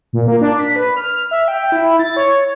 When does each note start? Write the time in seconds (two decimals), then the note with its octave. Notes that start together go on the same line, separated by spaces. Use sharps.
0.13 A#2
0.28 A#3
0.41 D4
0.59 B6
0.76 B4
0.97 F6
1.31 E5
1.48 G5
1.72 E4
1.99 A6
2.16 C#5